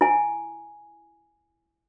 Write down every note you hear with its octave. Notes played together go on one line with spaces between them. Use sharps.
E4 G#5